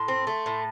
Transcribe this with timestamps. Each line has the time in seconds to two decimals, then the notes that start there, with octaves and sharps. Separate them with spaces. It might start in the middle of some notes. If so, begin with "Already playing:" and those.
Already playing: A2 C6
0.08 C4
0.27 A3
0.46 A2